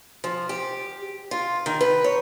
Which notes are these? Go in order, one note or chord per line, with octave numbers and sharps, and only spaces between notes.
F3
G4
F4
D#3
B4
C#5